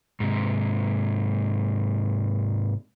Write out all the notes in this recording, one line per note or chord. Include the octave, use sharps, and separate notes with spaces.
G#2 C3